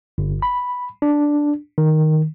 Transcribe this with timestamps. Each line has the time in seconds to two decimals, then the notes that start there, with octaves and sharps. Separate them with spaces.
0.18 G1
0.42 B5
1.02 D4
1.78 D#3